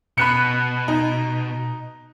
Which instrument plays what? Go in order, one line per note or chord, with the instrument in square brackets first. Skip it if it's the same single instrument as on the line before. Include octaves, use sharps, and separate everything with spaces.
[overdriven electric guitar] B2 [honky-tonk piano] B5 F#6 C#7
[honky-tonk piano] D#4